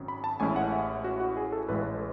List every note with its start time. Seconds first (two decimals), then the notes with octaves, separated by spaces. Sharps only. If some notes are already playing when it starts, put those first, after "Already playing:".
Already playing: G#1 F#2 C#4
0.08 B5
0.24 A5
0.40 A1 A2 G#3 C#4 E4 G#5
0.56 F#5
0.72 E5
1.04 F#4
1.20 F#4
1.37 G#4
1.52 A4
1.69 A1 A2 G#3 B4